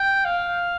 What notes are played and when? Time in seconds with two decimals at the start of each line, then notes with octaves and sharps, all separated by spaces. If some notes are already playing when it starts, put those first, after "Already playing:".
Already playing: G5
0.25 F5